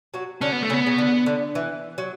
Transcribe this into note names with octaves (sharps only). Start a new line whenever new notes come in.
F#3 F#4
D3 C#4 D4
B3
A3
C#3 B3 C#4
C#3
D3
D3
E3
F#3